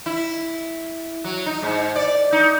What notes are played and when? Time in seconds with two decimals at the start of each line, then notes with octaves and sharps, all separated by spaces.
0.06 E4
1.24 F#3
1.46 D#4
1.62 G#2
1.96 D5
2.32 D#4